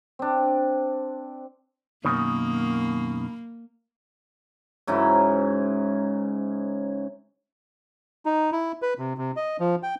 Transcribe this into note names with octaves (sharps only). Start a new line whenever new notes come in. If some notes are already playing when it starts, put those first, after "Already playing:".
C4 D4
F#2 B2 D#3 A#3
G#2 C#3 F#3 E4
D#4
E4
B4
C3
C3
D#5
F3
G5